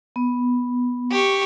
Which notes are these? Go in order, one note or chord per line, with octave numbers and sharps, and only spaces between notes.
B3
G4 C#6